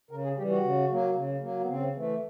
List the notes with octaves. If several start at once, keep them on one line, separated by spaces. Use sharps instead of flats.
C#3 A#4
G#4
E3 G3 G4
F#4
C#3
F#3 A#3
C#3
F#3 A#3
B3
C#3 C4
E3 A3